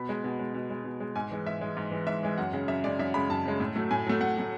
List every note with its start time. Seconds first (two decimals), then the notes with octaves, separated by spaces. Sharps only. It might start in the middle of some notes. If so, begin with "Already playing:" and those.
Already playing: B2 B5
0.09 G#3
0.24 B2
0.39 G#3
0.54 B2
0.70 G#3
0.84 B2
1.00 G#3
1.16 G#2 G#5
1.31 E3 G#3
1.46 G#2 E5
1.61 E3 G#3
1.77 G#2
1.91 E3 G#3
2.07 G#2 E5
2.23 E3 G#3
2.38 F#2 F#5
2.53 C#3 G#3
2.68 F#2 E5
2.84 C#3 G#3 D5
2.99 F#2 E5
3.14 C#3 G#3 B5
3.29 F#2 A5
3.45 C#3 G#3
3.60 A2
3.76 F#3 A3
3.91 A2 G#5
4.07 F#3 A3
4.21 A2 F#5
4.37 F#3 A3